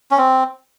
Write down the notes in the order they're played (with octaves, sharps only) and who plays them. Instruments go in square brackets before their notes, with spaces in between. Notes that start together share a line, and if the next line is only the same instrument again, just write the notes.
[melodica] C#4
C4